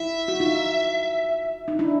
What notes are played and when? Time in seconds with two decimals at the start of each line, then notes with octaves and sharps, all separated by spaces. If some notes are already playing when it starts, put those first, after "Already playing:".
Already playing: E4 E5
0.28 F#4
0.40 D#4 F4
1.68 D#4
1.79 D4 E4